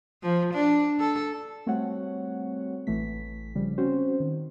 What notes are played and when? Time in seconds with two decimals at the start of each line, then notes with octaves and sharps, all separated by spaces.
0.23 F3
0.54 D4
0.99 A4
1.66 G3 A3 C4 F#4 C#5 F#5
2.87 A1 E3 A3 B6
3.55 C#3 F3 G3
3.78 C4 C#4 F#4 C5
4.20 D#3